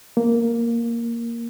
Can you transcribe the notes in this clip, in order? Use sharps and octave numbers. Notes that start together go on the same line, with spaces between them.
A#3